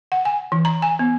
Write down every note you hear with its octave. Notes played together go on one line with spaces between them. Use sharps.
F#5
G#5
E3
A#5
G#5
B3